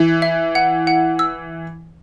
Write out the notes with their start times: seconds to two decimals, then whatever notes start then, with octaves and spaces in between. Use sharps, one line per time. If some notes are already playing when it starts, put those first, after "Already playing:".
Already playing: E3
0.22 E5
0.55 F#5
0.87 F#5
1.19 E6